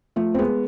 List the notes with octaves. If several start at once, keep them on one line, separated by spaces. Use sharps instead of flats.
F3 A3
C4
G#3 B3